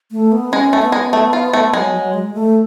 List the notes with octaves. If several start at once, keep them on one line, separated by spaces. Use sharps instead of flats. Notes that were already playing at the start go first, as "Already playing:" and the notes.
A3
B3
G#3 C#4
A3
B3
G#3
A3
F4
A3
F#3 G#3
F#3
G#3
A3